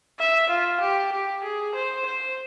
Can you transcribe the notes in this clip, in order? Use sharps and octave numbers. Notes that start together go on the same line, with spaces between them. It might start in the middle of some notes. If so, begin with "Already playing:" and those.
E5
F4
G4
G4
G#4
C5
C5